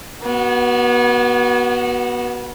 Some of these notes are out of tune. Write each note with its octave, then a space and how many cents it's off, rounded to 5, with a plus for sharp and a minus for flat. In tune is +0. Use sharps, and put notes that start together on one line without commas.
B3 -30 F#4 +15